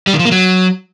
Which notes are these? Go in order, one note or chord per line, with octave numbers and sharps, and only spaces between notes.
G3
D#3
F3
A#3
F#3